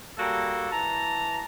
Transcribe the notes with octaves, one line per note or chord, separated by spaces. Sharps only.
G3 A#3 F#4 A4
E3 A5 A#5